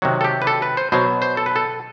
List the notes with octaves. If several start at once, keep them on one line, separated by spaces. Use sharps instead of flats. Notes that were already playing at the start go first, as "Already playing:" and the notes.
C3 D#3 F#3 F#4
A4
G4
B4
A4
B4
C5
B2 F#3 C5
C5
A4
B4
A4